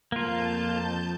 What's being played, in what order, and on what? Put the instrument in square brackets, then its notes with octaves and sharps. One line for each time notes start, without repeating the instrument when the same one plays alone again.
[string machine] F2 A5 G6 [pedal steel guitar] A#3 F4